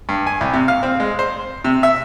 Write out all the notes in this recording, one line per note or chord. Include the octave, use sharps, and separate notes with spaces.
G2
G#5
C2
C3
F5
C4
G#3
C5
C3
E5